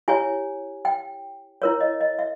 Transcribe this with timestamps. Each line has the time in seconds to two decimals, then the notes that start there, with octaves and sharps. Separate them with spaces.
0.08 E4 G4 C#5 G#5
0.85 G5
1.62 E4 A#4 C#5
1.80 D#5
2.01 D#5
2.19 E5